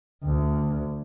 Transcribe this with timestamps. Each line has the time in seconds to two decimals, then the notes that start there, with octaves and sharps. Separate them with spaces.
0.24 D2